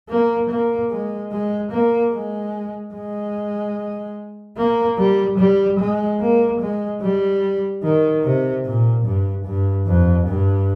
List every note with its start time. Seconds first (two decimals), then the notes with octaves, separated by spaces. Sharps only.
0.09 A#3
0.50 A#3
0.90 G#3
1.31 G#3
1.72 A#3
2.13 G#3
2.94 G#3
4.57 A#3
4.98 G3
5.38 G3
5.79 G#3
6.20 A#3
6.60 G#3
7.01 G3
7.83 D#3
8.23 C3
8.65 A#2
9.05 G2
9.45 G2
9.86 F2
10.27 G2